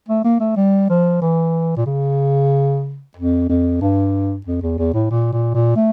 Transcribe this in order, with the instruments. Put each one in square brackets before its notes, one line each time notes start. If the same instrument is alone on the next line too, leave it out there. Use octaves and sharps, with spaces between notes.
[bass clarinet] A3
A#3
A3
G3
F3
E3
A#2
C#3
F2
F2
G2
F2
E2
E2
A2
A#2
A#2
A#2
A3